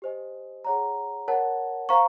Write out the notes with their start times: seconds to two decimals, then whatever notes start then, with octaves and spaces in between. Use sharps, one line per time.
0.02 G4 C5 D#5 G#5
0.65 G#4 C#5 F#5 A#5
1.28 A#4 C#5 F#5 A5
1.89 C5 F5 A#5 C#6